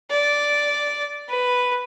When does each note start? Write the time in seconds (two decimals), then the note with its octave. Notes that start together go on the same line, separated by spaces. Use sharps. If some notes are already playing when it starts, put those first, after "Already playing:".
0.10 D5
1.28 B4